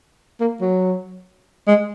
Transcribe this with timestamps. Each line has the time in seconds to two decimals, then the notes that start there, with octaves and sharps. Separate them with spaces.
0.40 A#3
0.61 F#3
1.67 G#3